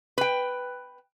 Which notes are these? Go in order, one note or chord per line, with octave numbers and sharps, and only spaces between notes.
B4 G5